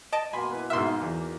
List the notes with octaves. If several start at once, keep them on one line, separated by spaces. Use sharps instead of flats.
D#5 A5 D7
B2 A#3 G#5 B5 C6
E4 B4
G#2 B2 A#3 D#4 E5 C6 F6
E2